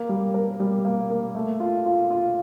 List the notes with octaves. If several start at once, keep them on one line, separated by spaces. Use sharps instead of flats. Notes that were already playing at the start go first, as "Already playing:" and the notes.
Already playing: A#3
G3
A#4
G3
A#3
A#3
A3
F4
F4
F4